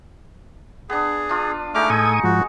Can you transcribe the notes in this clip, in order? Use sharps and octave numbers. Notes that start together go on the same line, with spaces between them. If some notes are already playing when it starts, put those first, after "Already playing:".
B3 D4 G#4
D4 F4
G#3 A3 D#4 F#5 D6 F6
A2 A4 G#5 C#6 D#6
G#2 F3 F#4